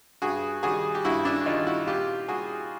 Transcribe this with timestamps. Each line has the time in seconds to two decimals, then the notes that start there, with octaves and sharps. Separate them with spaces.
0.22 G2 F#4 G#4
0.63 D#3 G3 F#4 G#4
0.95 G4
1.05 G2 E4 F#4
1.25 D4 E4
1.46 D#3 G3 D#4 F4
1.67 E4 F#4
1.87 A#2 F4 G4
2.28 G3 F#4 G#4